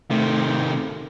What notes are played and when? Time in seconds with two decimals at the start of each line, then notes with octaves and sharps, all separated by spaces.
0.11 C3 D#3 A3